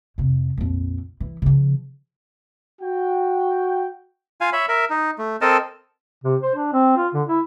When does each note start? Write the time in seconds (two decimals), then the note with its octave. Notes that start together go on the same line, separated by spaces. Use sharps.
0.18 F2 C3
0.58 A#1 F2
1.20 E3
1.42 C#3 F3
2.81 F#4 G5
4.41 F4 F5 G#5
4.53 C#5 E5 B5
4.69 A#4 E5
4.90 D#4
5.18 A3
5.41 C4 A4 A#4 D#5 A5
6.24 C3
6.41 C5
6.55 D4
6.73 C4
6.97 F4
7.14 D3
7.28 E4